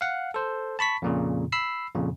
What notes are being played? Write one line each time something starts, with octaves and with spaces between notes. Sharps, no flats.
F5 F#5
A4 C5
A5 B5 C#6 B6
F2 A#2 C#3
B5 E6 C7
F2 A#2 C#3